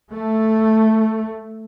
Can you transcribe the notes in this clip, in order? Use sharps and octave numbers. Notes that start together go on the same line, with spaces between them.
A3